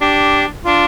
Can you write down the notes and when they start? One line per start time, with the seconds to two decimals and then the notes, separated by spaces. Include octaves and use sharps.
0.01 D4 G4
0.65 D4 F4